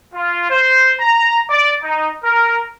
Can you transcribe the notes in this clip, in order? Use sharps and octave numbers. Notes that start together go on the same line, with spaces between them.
F4
C5
A#5
D5
D#4
A#4